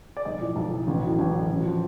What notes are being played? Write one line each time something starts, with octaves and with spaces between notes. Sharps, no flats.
D5
B1 D#5
A2 F3
B1
A2 F3
A1
A2 F#3
A1
A2 F#3
A1
F3